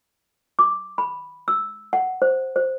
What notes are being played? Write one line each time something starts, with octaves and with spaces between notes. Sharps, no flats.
D6
B5
E6
F#5
C5
C5